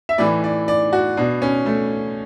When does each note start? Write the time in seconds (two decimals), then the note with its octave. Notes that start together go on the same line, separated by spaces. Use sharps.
0.09 E5
0.18 A2 E3 D5
0.44 D5
0.68 D5
0.93 F#4
1.17 B2 D4
1.42 C#4
1.66 A3